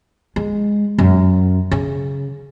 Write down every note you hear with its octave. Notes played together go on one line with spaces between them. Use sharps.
G#3
F#2
C#3